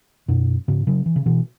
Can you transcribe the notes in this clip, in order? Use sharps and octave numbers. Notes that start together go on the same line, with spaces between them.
F#2 B2
G#2 C#3
C#3 F#3
E3
C#3
B2 E3